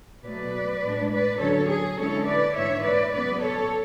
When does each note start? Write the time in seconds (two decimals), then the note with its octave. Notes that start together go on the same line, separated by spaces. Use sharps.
0.24 B2 F#3 A3 B4 D5
0.83 A2 G#3 D4
1.11 B4 D5
1.40 D3 F#3 C#4 A4 C#5
1.69 G#4
1.98 D3 G#3 C#4 E4 A4 C#5
2.26 B4 D5
2.55 G#2 E3 A3 D4 C#5 E5
2.84 B4 D5
3.13 C#3 F#3 B3 B4 D5
3.41 A4 C#5